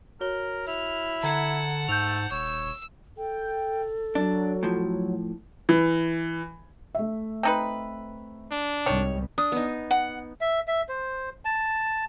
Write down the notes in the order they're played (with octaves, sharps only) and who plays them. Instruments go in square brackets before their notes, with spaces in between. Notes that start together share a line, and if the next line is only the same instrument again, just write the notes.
[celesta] F#4 C#5 G7 [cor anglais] A#4
[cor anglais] E4 [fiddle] F6
[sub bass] D3 [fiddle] F#5 A5 [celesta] A#5 G#6
[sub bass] G#2 [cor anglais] A3 [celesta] G6 F7
[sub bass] D#1 [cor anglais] C#5 [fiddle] E6
[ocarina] A4 [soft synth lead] G5
[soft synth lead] F#3 [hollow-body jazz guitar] D4
[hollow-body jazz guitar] A2 F3
[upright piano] E3
[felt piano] A3 E5
[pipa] C4 D#4 B4
[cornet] D4
[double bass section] C2 G#2 G3 [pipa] D#3 C#5
[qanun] D4 [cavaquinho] D#6
[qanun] B3 D#4
[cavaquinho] F#5
[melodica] E5
E5
C5
A5